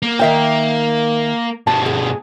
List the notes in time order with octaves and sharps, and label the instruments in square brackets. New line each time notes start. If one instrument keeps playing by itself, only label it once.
[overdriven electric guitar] A#3
[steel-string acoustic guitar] D#3 E5 G5
[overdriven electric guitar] G2 B2 [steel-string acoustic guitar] A5
[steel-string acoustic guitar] G#4